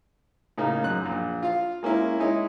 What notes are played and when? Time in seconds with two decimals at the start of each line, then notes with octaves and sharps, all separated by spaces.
0.58 A2 C#3 A#3 D#4
0.83 F#2 F#6
1.06 A#1
1.43 F4 F5
1.83 G#3 A#3 C#4 E4
2.19 G#3 D#4 E4 C#5 D#5